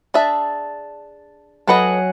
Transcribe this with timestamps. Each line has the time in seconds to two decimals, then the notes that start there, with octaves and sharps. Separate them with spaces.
0.14 D4 G#4 E5 A5
1.67 F#3 A4 B4 D#5 F#5 G#5